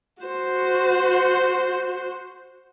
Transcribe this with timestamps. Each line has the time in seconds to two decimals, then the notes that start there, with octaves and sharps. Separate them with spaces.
0.22 F#4 C5